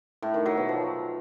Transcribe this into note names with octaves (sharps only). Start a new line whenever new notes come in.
A2
D#3
F#3
B2
F3